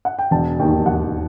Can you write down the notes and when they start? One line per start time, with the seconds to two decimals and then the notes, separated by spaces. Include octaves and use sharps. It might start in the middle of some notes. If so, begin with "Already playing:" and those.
0.05 F#5
0.19 G5
0.31 E1 A5
0.59 D#2 D#3 G5
0.86 E1 F#5